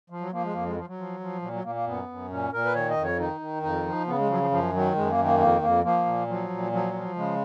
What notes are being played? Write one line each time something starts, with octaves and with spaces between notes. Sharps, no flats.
F3
F#3
F3 A#3
G#3
F2 A#3
G#3
F3
F#3
F3
F3
A#2 F#3
F#3
A#2 A#3
A#3
F#2 B3
F#2
A#2 C#4
A#2 A#4
B4
D#3 C#5
D#5
F2
C#5
D#3 D#4
D#3
F2 D#4
F3
C#3 B3
G#3
F3 F#3
F3
F#2 F3
D#3 F#3
F#2 G#3
A#3
D#3
A#3
F2 A#3
F2 A#3
F3 A#3
A#2
F3 F#3
A#2
F3 F#3
F3
C#3 G#3